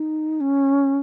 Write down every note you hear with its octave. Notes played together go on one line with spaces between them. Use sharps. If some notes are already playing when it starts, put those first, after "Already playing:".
Already playing: D#4
C#4